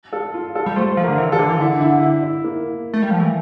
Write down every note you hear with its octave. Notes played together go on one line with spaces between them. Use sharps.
A4
F4
A4
G3
A3 C5
F3
A#4
D3
E3
A4
D3
E3
D3 E4
E4
E4
E4
A#3
A3
G3
F3
E3